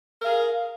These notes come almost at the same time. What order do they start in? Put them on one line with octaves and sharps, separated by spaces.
A#4 F5 G#4